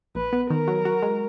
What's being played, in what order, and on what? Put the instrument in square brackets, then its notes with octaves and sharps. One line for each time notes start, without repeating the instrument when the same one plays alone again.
[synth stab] A#1 [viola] B4
[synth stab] B3
[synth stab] D#3 [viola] A#4
[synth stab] F#3
F#4
G#3